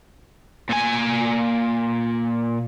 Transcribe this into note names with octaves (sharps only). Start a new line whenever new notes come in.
A#2 G#5